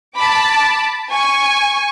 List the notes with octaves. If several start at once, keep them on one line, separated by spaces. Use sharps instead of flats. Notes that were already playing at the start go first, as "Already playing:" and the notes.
A5 B5 D6
G#5 C#6